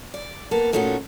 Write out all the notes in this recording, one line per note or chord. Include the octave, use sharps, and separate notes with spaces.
D5
A#3 B3 A4
A#2 A3 C#4 D#4 F4 F#4